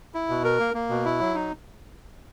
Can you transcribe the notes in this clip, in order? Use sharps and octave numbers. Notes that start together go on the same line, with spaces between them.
E4
B2
A#4
A#3
A#3
B2
E4
F#3
D#4